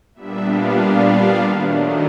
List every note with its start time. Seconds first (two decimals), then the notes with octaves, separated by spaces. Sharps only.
0.15 A#2 G3 B3 D4 E5
0.46 F5
0.78 F5
1.09 F5
1.40 D#3 F#3 A3 D4
1.72 D#5